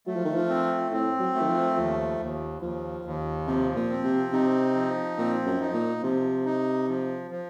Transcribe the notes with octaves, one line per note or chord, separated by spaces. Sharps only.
F#3 A3
F3
D#3
F3
C4
A2 C4
F#3
A3
D#3
F3
D#2 F3
D#2
D#2 F3
D#2
C3 F3
A#2
C4
C3
C3 D#4
F3
A#2 C4
F#2
D#4
A#2
C3 F3
D#4
F3
F3